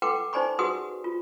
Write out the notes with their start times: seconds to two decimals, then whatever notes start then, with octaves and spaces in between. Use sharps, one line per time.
0.02 A4 B4 F#5 G5 C6 D6
0.33 D#4 C5 D5 G#5 B5 C#6
0.59 F#4 G#4 B4 F#5 C6 D#6
1.04 F4